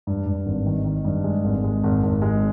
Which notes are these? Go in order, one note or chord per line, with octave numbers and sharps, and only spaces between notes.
G2
G2
G#1
D#3
D#3
G2
G#3
G#1
G#3
G#1
G#1
G#3